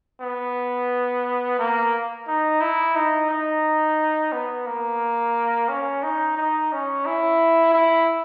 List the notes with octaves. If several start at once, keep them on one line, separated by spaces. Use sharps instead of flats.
B3
A#3
D#4
E4
D#4
D#4
B3
A#3
C#4
D#4
D#4
C#4
E4
E4